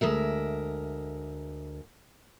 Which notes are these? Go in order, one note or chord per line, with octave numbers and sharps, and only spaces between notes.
D2 G#3 A#4 E5